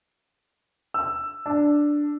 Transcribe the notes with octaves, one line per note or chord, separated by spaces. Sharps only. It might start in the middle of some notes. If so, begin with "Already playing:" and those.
E6
D4